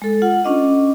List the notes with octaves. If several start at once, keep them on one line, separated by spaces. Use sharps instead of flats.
G#3 A4
F4 F#5
C#4 D4 D#5